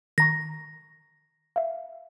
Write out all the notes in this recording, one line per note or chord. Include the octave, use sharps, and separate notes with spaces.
D#3 A#5 C#6 A#6
E5 F5